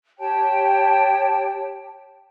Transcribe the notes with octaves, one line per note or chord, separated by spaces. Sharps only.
G4 C#5 G5 A5